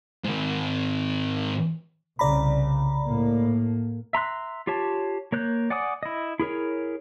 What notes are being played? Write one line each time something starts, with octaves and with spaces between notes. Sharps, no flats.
G#2 D#3
C2 C#3 D5 A#5 B5
A2 A#3
E5 A#5 C6 F#6
F4 G4 C#5 A5
A#3 C#5 F#6 G6
D5 F#5 G#5 D6 D#6
E4 D#5
E4 G#4 A#4 C#5